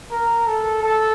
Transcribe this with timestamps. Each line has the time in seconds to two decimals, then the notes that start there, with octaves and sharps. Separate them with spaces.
0.11 A#4
0.47 A4
0.83 A4